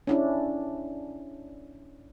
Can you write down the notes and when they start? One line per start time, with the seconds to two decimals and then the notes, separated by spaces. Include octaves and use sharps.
0.07 C#4 D4 E4